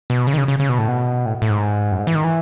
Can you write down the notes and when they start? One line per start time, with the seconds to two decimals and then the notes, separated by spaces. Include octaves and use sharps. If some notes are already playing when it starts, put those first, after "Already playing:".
0.10 B2
0.27 C#3
0.34 D#3
0.38 C#3
0.48 C#3
0.60 C#3
0.69 B2
0.78 A2
0.88 B2
1.26 A2
1.42 A2
1.50 G#2
1.92 F#2
1.99 G#2
2.07 E3
2.15 D#3
2.24 E3